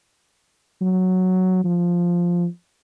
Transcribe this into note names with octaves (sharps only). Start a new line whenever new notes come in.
F#3
F3